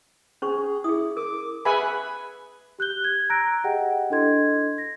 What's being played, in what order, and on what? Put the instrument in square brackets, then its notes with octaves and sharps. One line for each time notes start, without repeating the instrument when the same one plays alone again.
[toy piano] C#4 C5 C#6 [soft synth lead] G#4
[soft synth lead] E4 [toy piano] G#4 D#6
[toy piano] A#4 [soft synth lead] D6
[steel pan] G#4 B4 E5 F#5 G#5 B5
[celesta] G4 F#6 G6 G7
G#6
A#5 E6 F#6 G6 A#6 D7
G4 G#4 D#5 F#5 G5
D4 E4 A4 D#5 C6 G#6
A#6